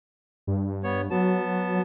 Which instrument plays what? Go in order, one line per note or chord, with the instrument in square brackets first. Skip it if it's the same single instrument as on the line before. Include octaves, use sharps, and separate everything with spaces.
[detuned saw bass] G2
[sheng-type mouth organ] B3 C#5
[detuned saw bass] F#3 [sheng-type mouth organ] B3 A5